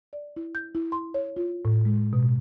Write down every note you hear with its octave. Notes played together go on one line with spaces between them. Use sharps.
D5
E4
G6
E4
C6
C#5
F4
A2
G#3
B2
B2